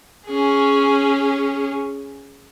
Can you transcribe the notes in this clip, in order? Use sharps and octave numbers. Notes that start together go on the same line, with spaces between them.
C#4 G#4